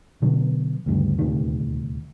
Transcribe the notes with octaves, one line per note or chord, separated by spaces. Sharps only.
B2 D3 F#3
D2 G2 C#3
D#1 D2 C3 D#3